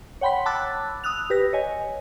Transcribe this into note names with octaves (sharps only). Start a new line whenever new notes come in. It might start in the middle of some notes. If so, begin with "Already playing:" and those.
C#5 F#5 G5 B5 C6 B6
A5 B5 D6 E6 F#6 A6
D#6 E6 F#6 F7
G4 B4 A#6
C#5 D#5 G#5